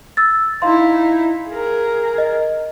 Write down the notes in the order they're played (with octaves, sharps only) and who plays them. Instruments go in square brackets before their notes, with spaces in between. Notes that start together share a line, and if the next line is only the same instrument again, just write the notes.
[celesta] E6 A6
[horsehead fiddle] D#4 E4 [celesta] F5 C6
[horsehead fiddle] G#4 A#4
[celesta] D#5